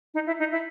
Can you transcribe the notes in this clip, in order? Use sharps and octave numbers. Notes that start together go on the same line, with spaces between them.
D#4
E4
D#4
E4